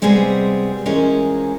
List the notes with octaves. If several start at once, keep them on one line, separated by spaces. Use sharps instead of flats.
C3 G3 G#3 B3 C4 G#4
E3 F3 G#3 C#4 A#4 A#5